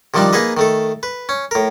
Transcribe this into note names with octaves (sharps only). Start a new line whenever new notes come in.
C3 D#3 F3 G3 D4 D#4
A#3 D#4 G#4 B4 D#5
D#3 A3 A4
B4
C#4
A2 A#4